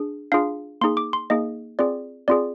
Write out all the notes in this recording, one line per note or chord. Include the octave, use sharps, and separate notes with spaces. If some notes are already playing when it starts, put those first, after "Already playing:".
Already playing: D4 G#4
D4 F4 G#4 F5
A#3 D#4 G#4 C6
D6
C6
A#3 D#4 G#4 D#5
C4 F4 G#4 D5
C4 F4 G#4 D5